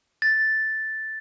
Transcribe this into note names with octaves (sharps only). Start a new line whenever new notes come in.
A6